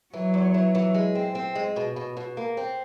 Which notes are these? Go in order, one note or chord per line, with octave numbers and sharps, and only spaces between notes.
E3 F#3
E2
E3
E3
G#3
C4
C4
G#3
B2
B2
B2
A#3
C4